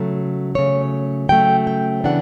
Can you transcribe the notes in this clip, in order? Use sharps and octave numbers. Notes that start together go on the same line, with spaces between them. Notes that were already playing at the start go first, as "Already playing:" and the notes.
Already playing: C#3 F#3 A3
C#3 F#3 A3 C#5
C#3 F#3 A3 G5
G5
C#3 E3 B3 D4 F#5